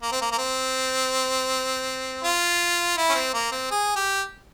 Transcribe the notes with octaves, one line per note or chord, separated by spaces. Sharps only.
A#3
C4
A#3
A#3
C4
F4
E4
C#4
C4
A#3
C4
G#4
G4